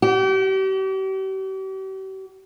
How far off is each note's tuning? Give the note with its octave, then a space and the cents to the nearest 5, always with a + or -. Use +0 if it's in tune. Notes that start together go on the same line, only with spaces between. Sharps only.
G4 -40